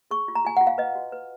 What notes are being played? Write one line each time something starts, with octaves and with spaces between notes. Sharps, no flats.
G#4 C#6
F4
A#5
F4 G#5
F4 F#5
F5
B4 D#5
F#4
B4